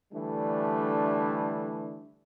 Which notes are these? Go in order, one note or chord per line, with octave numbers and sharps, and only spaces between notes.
D3 E3 G3 A3 D4